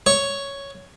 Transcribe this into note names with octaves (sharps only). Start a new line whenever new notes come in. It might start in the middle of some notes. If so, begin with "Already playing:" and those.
C#5